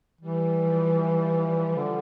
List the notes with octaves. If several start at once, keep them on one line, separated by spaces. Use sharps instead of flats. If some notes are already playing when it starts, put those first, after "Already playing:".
E3 G3
F3
F3
F3
D3